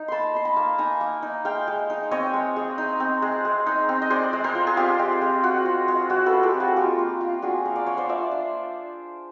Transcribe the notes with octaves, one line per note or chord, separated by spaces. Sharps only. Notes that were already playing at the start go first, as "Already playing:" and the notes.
Already playing: D#4
A#3 A5 B5 C6
D#4 C6
A5 B5
A#3
D#4 G#5 A#5
A#3
D#4
G#3 F5 G5
G#3
D#4
C4 C#5 D#5
G#3
G#3
D#4
C4
G#3
G#3
D#4
C4
D#5
G#3 C5 D5
G#3
A#4 C5
F4
G#4
C4 F4 G4
G#3
G#3
F4 F#4
C4
G#3
G#3 F#4
A4 B4
F4
G4 A4
C4
F#4 G#4
A#3 F4 G4
A#3
F4
D4 F#4 G#4
A#3
D5
A#3 C#5
C5 D5
F4 D5 E5
D4